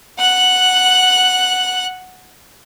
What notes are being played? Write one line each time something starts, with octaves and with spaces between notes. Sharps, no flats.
F#5 F#6